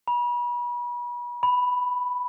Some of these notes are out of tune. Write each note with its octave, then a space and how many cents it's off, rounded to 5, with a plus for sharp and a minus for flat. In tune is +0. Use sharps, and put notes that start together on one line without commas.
B5 -35
B5 +0